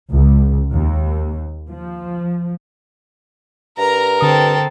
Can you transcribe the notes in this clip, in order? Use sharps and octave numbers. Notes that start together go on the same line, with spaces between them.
C#2
D#2
F3
G2 A#4 A#5
D3 C4 A4 D#6